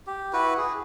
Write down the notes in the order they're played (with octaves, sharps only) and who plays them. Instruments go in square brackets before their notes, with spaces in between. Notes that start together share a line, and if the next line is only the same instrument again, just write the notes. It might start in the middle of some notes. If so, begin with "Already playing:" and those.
[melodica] G4
E4 F#4 B4
G#4